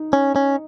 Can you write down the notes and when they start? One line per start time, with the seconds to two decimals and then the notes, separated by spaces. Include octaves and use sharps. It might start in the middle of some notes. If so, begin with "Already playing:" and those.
Already playing: D#4
0.13 C#4
0.36 C#4